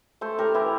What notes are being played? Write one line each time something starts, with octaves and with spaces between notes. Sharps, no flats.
A3 A4 C5
A2 G4 A#4
E3 E4 G4